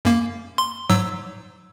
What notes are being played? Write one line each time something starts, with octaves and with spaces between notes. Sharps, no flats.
F#2 A#3
C6
G#2 F#3 E6